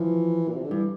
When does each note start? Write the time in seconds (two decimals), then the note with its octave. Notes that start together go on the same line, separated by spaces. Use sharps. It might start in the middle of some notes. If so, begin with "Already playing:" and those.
Already playing: E3 F3
0.49 A#2
0.56 C3
0.64 D3
0.71 G2 E3